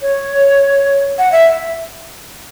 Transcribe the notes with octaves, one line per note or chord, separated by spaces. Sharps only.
C#5
F#5
E5